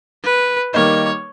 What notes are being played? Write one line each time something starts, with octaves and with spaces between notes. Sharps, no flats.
B4
D#3 G3 A#3 D#4 C#5